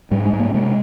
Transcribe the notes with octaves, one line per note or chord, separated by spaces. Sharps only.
G#2 G3
G#3
G#2
A#3
C3 G#3